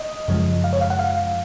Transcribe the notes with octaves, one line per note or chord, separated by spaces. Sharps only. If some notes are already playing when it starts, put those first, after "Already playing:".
Already playing: D#5
F#2 C#3 F3 G#3
F5
C#5
F5
F#5
F5